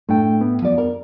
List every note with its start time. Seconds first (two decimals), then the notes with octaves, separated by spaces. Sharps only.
0.09 A2 A3 D4 G5
0.41 B3
0.62 F3 D5
0.78 A#4